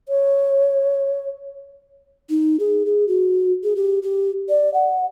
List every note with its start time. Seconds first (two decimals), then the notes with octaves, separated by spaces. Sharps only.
0.09 C#5
2.30 D#4
2.60 G#4
2.86 G#4
3.08 F#4
3.64 G#4
3.76 G4
4.03 G4
4.49 D5
4.74 F#5